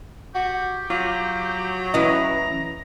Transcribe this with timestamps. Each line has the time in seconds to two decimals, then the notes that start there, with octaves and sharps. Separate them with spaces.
0.35 F#4 G4
0.90 F#3 F4
1.94 E3 C#4 E4 B4 D#5 A#5